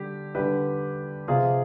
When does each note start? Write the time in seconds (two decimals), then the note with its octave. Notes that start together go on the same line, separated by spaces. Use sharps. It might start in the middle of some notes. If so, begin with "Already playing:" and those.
Already playing: D3 G3 G4
0.35 D3 G3 G4 B4
1.28 C3 F3 F4 G#4